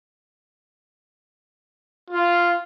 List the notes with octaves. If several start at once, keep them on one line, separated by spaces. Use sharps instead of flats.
F4